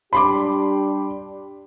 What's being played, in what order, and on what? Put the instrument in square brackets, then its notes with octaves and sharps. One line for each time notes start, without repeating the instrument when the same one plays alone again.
[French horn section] G3 D4 G4 [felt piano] B5 C6 D6